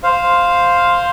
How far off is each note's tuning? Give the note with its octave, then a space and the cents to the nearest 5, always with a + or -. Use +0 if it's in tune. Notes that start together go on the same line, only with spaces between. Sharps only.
C5 +0 F5 +0